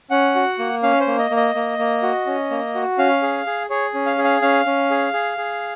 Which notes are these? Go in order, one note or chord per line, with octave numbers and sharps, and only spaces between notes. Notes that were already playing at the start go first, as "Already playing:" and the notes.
C#4 F#5
F#4
A#3
C#4 F5
C5
A#3
D#5
A#3
D#5
A#3
A#3
F#4
C#4
A#3
F#4
C#4 F5
G#4
G#4
G#4 C#5
C#4
F5
G#4
F5
C#4 F5
C#4
G#4
G#4
G#4